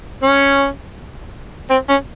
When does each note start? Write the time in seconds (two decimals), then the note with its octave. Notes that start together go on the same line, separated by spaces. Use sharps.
0.23 C#4
1.70 C4
1.89 C#4